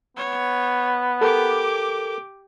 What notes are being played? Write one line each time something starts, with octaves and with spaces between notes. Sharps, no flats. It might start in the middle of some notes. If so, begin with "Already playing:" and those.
B3 C#5
G4 A4 A#4 D6